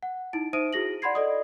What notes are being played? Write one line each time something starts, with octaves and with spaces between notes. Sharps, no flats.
F#5
D#4 E4 D7
D#4 C5 E5 D#6 D7 D#7
E4 F#4 G#4 A#6 F#7
D5 F#5 B5 C6 G#6 C7
A4 D5 D#5 D#6